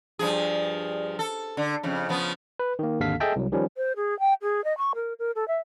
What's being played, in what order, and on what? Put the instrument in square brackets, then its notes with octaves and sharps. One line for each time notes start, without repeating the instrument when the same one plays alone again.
[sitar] G2 F3 G#4
A4
D3
F2 C#3
C#3 F3 B3
[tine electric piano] B4
D#3 A#3
G#1 D#2 D3 A4 F5 B6
G#4 A4 D#5 E5 G5 A5
C2 F#3
D#3 F3 G3 C#4
[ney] C5
G#4
G5
G#4
D#5
C#6
A#4
A#4
A4
E5